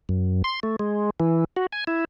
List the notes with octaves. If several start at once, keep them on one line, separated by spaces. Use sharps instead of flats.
F#2
C6
A3
G#3
E3
F#4
G#5
E4